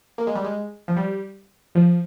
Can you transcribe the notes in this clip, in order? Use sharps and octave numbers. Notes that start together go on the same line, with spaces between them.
A#3
G#3
G3
G#3
F3
G3
F3